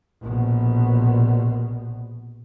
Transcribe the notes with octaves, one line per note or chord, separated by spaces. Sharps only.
A#1 B2